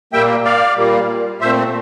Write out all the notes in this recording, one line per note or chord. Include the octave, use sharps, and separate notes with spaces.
A#2 G3 A#3 E5 G5
D5 F5
A#2 G3 A#3
A#2 A3 C4 C5 E5